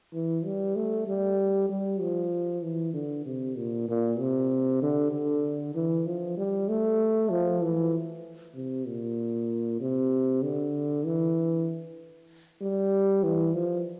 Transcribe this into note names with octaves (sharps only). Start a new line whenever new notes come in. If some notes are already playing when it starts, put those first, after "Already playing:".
E3
G3
A3
G3
G3
F3
E3
D3
C3
A#2
A#2
C3
D3
D3
E3
F3
G3
A3
F3
E3
C3
A#2
C3
D3
E3
G3
E3
F3